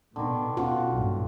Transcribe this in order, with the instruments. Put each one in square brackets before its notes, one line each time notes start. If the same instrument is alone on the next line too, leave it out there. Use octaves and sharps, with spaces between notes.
[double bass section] B2 [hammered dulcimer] D3 D#3
[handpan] C#4 F4 [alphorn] F#4
[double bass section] B1 G2 A#2